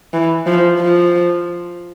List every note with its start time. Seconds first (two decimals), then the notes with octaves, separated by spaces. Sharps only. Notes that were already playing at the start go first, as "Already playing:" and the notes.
0.14 E3
0.47 F3
0.79 F3